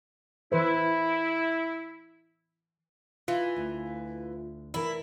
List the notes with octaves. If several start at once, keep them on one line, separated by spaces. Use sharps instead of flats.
E3 E4 B4 C5
E3 F4
D2
E3 E4 A#4